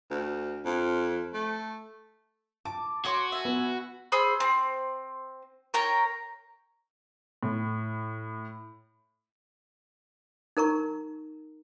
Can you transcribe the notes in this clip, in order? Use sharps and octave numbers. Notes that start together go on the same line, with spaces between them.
D2
F2
A3
A5 D6
F#4 C#5 C6 D6
E5 G#5
B3
G#4 C5 B5 E6
C4
A#4 C#5 G5 A#5
A2
D#4 A#4 A#5 C#6